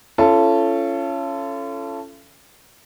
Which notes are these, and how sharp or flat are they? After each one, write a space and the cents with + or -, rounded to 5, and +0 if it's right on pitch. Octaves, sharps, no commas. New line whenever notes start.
C#4 +0 F4 -40 A4 +0